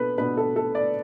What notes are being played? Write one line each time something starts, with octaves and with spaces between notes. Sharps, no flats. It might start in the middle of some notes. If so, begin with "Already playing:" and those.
Already playing: B2 B3 D4 A4 B4
B2 B3 D4 B4
A4
A4
D5